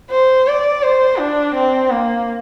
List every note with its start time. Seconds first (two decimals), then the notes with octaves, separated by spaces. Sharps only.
0.11 C5
0.47 D5
0.83 C5
1.19 D4
1.55 C4
1.90 A#3